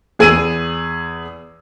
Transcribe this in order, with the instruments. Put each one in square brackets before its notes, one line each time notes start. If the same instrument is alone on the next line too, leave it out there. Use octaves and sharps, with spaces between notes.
[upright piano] E2 G#4 E6 D#7